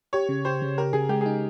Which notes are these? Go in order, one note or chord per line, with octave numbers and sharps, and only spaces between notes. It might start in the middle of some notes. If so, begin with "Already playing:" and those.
G4 C#5
C#3
G4 C5
C#3
G4 A#4
C#3 G#4
G#3 G4
D#4 G#4